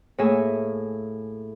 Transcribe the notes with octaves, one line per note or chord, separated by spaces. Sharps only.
A2 A#3 G#4 E5 G#5